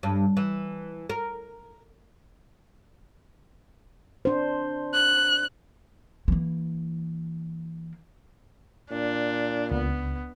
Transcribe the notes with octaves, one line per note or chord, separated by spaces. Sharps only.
G2
E3
A#4
D4 C5
F#6
E3 A#3
A#2 D4
C#2 B3